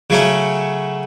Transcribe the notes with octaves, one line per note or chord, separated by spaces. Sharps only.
C#3 F#3 A3 C#4